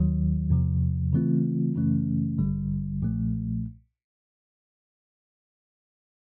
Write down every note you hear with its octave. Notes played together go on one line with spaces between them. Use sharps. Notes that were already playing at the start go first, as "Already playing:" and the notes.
Already playing: D#2 D#3 F#3
E2 C3 F3
C#3 E3 A3 C4 F4
F#2 C#3 E3 A3 C#4
A1 G2 D3 G3
B1 A#2 F3 A3